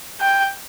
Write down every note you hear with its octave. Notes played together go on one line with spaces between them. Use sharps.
G5